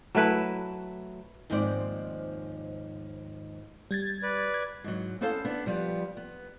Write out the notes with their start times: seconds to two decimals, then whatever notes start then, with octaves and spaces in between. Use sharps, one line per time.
0.15 F#3 A3 E4 B4
1.50 D#2 G#2 F3 C4 C5 D5
3.91 G3 G#6 A6
4.23 B4 D5
4.54 G#6
4.84 G#2 F#3
5.21 B3 C#4 E4 A4 C5 F5
5.45 B3 D4
5.66 F3 G3 B3
6.17 B3